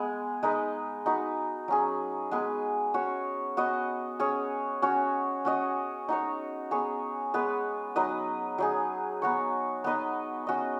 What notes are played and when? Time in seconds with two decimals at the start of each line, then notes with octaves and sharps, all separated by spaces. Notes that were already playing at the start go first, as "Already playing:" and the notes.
Already playing: G#3 B3 G#4
0.43 G#3 D#4 B4 D#5
1.06 D#4 F#4 B4
1.68 F#3 C#4 G#4
2.31 G#3 B3 G#4 B4
2.94 C#4 F#4 C#5
3.57 B3 F#4 D#5
4.20 C#4 G#4 C#5
4.82 C#4 F#4 C#5
5.45 C#4 F#4 D#5
6.08 D#4 F#4 C#5
6.71 B3 G#4 C#5
7.34 G#3 B3 G#4 B4
7.96 F#3 D#4 B4 D#5
8.58 F#3 D#4 G#4
9.22 B3 F#4 C#5
9.84 B3 D#4 B4 D#5
10.47 C#4 F#4 D#5